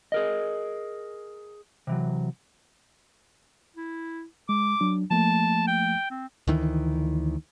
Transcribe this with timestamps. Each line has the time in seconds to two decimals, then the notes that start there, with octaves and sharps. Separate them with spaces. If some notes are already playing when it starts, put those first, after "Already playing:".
0.12 G#4 A#4 D#5
1.87 C3 E3 F#3
3.76 E4
4.49 G#3 D6
4.81 F#3 D4
5.11 F3 A3 A#3 A5
5.67 G5
6.11 C4
6.47 D2 D#3 E3